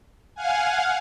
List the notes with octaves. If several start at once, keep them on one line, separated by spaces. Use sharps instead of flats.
F5 F#5 G#5